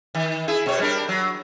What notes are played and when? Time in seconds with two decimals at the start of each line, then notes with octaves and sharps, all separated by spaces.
0.15 D#3
0.48 E4 G#4
0.66 B2 C#5
0.79 G3 D4 A#4
1.09 F#3